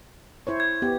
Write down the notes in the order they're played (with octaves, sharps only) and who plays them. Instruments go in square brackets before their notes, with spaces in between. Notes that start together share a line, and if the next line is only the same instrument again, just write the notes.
[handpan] E4 C5 C#5
[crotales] G#6
[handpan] B3 G4